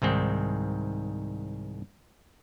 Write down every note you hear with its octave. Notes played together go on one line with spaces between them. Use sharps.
C2 G#2 D#3 C4